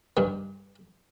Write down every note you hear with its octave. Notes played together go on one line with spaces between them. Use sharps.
G2 D#3